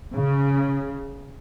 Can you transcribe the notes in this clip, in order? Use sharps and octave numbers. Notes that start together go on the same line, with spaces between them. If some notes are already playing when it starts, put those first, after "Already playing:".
C#3